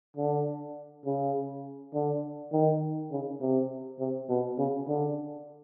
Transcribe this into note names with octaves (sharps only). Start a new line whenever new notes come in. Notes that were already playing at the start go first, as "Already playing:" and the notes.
D3
C#3
D3
D#3
C#3
C3
C3
B2
C#3
D3